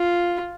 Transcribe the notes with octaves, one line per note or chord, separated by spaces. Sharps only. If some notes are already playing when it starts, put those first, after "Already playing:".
Already playing: F4